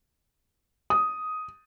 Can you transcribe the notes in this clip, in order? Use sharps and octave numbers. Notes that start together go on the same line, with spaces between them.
D#6